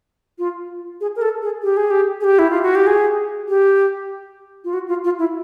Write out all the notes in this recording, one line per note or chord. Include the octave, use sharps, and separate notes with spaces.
F4
G#4
A#4
A4
G#4
G4
G#4
G4
G#4
G4
E4
F4
F#4
G4
G#4
G4
F4
F#4
F4
F4
E4